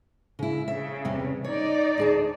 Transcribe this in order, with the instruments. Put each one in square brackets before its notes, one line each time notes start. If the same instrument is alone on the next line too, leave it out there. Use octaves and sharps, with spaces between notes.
[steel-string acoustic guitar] C#3 E4
[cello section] C#3 [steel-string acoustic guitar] E5
[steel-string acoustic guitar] E2 C3 G3
[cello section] D#4 D5 [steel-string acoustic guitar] C#5
[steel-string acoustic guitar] D2 G#4 A5